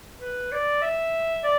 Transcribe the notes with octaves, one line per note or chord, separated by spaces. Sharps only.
B4
D5
E5
D5